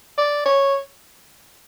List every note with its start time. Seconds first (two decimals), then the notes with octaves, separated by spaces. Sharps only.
0.18 D5
0.46 C#5